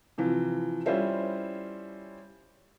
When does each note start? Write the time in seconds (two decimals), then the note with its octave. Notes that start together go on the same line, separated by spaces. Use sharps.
0.18 C3 E3 F3
0.86 G3 C#4 E4 F4 C5 E5